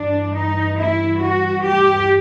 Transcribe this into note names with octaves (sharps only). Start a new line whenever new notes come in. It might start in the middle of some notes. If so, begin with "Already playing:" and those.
Already playing: G2 E3 D4
D#4
E4
F#4
G4